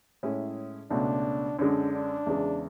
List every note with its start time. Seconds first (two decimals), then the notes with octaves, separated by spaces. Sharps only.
0.23 A2 G#3 C#4 E4 G#4
0.90 C#2 B2 A3 D4
1.59 F#2 D3 G#3 D4
1.93 D4
2.27 E2 C#3 G#3